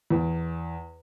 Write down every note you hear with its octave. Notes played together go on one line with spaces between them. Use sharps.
E2